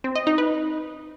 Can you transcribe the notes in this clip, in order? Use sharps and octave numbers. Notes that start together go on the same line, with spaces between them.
C4
D#5
D#4
B4